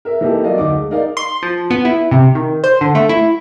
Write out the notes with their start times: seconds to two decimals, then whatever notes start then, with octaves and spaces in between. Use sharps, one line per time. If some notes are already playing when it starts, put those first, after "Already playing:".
0.05 A#4 E5
0.21 E3 A#3 D#4 G4 A4
0.44 F#3 A#4 D5 D#5 F5
0.58 D2 D#4 D6
0.74 G#3
0.91 D#4 A#4 D5 F5
1.17 C6
1.43 F3
1.70 B3
1.85 E4
2.11 C3
2.35 D#3
2.64 C5
2.81 D3
2.95 A3
3.09 E4